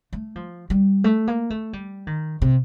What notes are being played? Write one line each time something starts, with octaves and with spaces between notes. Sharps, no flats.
A3
F3
G3
A3
A#3
A3
G3
D#3
C3